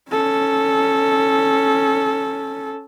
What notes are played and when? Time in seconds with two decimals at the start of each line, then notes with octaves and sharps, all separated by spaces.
0.11 C#4 A4